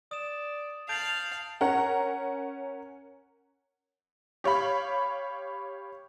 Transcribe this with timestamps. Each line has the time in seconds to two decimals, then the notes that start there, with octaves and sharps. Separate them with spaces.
0.11 D5 D#6 E7
0.89 F5 A5 G6 A6 C7 D7 F#7
1.61 C#4 A#4 F#5 A#5
4.44 G4 C#5 F5 B5